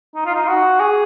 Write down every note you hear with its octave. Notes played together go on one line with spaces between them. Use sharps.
D#4
F4
D#4
F#4
G#4